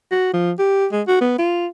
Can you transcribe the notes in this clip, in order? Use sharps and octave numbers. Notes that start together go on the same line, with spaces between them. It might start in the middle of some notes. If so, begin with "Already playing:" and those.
F#4
F3
G4
G#3
F#4
B3
F4